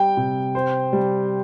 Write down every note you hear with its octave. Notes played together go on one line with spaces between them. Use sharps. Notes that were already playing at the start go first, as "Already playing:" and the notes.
Already playing: G3 G5
C3
C5
G3